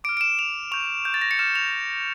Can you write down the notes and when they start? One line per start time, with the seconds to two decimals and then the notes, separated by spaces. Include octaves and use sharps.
0.04 D6 D7
0.09 F6
0.17 D7
0.21 E7
0.39 F7
0.72 C#6 G6 F7
1.05 G6
1.14 A6
1.22 A#6
1.31 C#7
1.39 D6 F6 E7
1.55 F7